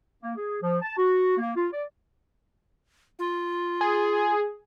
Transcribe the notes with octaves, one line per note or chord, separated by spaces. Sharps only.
A#3
G#4
F3
A5
F#4
A#3
F4
D5
F4
G#4